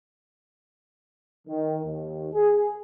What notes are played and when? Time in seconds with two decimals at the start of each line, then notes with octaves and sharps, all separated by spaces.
1.47 D#3
1.84 D#2
2.34 G#4